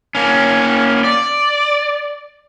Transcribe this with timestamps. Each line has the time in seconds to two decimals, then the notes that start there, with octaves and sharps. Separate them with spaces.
0.15 A#3 C#4
1.04 D5